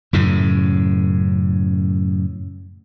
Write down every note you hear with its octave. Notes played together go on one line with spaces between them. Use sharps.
F#2 A2 C#3